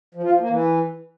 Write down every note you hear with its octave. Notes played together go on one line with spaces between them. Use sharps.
F3
F4
F3
A#3
E3